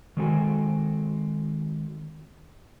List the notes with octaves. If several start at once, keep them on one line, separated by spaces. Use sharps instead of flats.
D#3 G#3 C4 F#4 A4 G#5